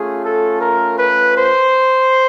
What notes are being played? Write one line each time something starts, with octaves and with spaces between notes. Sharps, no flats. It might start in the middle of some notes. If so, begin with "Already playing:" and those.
Already playing: A3 C#4 F4 G#4
A4
A#4
B4
C5